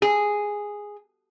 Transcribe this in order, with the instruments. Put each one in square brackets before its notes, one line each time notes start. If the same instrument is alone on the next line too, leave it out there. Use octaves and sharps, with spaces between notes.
[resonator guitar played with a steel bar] G#4